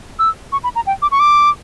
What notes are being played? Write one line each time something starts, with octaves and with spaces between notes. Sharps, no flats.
E6
C#6
B5
A#5
G5
D6
C#6
D6